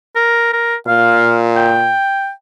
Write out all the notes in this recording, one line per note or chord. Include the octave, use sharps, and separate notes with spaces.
A#4
A#4
A#2 F5
G5